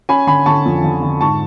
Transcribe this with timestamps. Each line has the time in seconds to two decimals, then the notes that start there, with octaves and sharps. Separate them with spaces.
0.09 C#4 G#5 B5
0.27 D3 G#5 B5
0.46 D3 A5 C#6
0.65 F2
0.84 D3
1.03 D3
1.21 G#2 A5 C#6